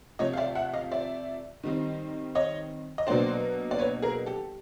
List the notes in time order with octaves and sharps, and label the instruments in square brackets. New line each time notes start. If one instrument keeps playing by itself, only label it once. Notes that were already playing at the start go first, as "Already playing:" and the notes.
[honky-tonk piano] C3 F3 A3 C#5 D#5
F5
D5 E5
E5 F#5
D#5 F5
D5 E5
D#3 G3 C4 D#4
C#5 D#5
D#5
B2 F#3 A#3 D4 C5 D5
D5
B4 C#5
G#4 A#4
G4 A4